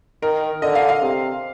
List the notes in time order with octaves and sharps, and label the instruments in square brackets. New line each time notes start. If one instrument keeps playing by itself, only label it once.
[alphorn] D#3 [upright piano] A#4
[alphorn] D3 [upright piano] D#5
[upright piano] F5
F5
[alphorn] C3